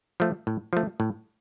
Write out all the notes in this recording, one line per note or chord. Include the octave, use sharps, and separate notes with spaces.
F3 A3
A2
F3 A3
A2